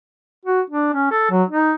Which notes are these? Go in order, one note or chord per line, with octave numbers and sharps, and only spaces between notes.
F#4
D4
C#4
A4
F#3
D#4